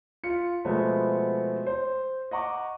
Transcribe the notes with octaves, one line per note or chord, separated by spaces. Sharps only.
F4 C#7
B2 F3 G#3 A3 B3 C4
C5
D#5 F#5 A#5 C#6 D6